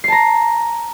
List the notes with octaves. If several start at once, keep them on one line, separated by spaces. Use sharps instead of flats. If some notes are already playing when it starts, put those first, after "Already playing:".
A5 A#5 C7